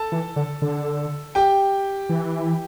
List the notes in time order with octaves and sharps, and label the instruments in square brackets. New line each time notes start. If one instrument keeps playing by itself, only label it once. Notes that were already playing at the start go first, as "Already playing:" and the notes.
Already playing: [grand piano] A4 A5
[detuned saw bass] E3
D3
D3
[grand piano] G4 G5
[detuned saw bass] E3